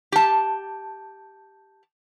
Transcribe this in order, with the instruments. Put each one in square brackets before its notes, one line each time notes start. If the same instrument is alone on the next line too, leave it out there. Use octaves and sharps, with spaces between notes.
[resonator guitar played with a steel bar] G4 A5